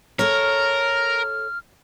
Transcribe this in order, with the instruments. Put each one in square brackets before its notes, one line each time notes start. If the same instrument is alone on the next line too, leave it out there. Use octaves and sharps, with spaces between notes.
[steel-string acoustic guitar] A4 C#5 [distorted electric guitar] A#4 [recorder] F6